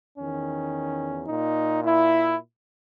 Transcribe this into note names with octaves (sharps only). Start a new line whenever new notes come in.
E2 D#3 C#4
A#2 D#4
E4